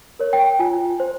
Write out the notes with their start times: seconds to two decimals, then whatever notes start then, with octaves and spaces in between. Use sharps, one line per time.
0.19 A#4 C#5
0.33 G5
0.59 F4 G#5
1.00 C5